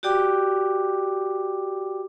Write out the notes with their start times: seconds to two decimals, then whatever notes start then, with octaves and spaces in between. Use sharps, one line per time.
0.03 F#4 G4 D5 G5 D6